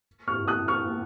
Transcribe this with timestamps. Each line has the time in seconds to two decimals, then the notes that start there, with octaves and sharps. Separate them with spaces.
0.28 C#6 F6
0.48 D#6 F#6
0.68 C#6 F6